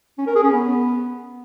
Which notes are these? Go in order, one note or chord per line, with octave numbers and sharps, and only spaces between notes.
C#4
A#4
G#4
C#4
B3